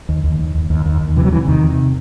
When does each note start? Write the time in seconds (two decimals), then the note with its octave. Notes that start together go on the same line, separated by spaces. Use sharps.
0.09 D#2
0.24 D#2
0.39 D#2
0.55 D#2
0.70 D#2
0.85 D#2
1.01 D#2
1.16 C3 E3
1.25 F#3
1.32 C3 E3
1.47 E2 D#3
1.63 C3